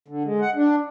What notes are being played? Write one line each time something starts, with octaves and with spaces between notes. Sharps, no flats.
D3
G#3
F#5
D4